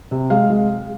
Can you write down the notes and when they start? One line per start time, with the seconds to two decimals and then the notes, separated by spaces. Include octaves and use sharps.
0.11 C3
0.30 G#3 F5
0.50 G#3